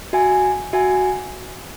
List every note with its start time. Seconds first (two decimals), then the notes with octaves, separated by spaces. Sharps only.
0.13 F#4 E5 G#5
0.73 F#4 E5 G#5